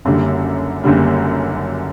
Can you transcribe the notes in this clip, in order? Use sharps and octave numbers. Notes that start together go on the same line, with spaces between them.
F#1 F#2 D3 G3
F#1 F#2 D3 G3